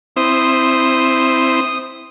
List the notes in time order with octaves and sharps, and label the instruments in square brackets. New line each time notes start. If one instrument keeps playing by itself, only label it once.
[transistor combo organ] C4 E4 C5 [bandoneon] D#6